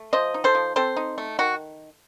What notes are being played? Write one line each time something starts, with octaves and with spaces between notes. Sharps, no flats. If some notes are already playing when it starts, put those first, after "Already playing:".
Already playing: A3
F3 C5 D#5
D#4
A4 C5
F3
C4 A4 C5
D#4
A3
D#3 F#4